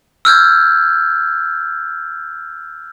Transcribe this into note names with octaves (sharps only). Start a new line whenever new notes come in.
E6 F6 G6 G#6